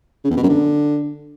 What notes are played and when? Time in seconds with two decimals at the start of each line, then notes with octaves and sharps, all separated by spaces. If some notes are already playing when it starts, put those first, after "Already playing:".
0.24 C#3
0.31 E2
0.37 B2
0.43 F#2
0.49 D3